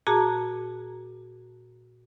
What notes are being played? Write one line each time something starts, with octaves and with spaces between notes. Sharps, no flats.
A#2 F#4 G#4 A5 A#5